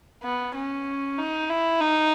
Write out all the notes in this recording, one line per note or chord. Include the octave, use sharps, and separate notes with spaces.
B3
C#4
D#4
E4
D#4